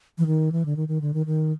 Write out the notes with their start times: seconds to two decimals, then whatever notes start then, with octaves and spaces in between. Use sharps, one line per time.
0.18 E3
0.26 D#3
0.52 E3
0.66 D3
0.77 D#3
0.88 D#3
1.01 D3
1.14 D#3
1.26 D#3